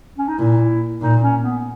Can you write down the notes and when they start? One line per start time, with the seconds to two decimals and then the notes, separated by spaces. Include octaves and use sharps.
0.18 C#4
0.28 D#4
0.38 A#2 E4
1.01 A#2 D#4
1.22 C#4
1.42 B3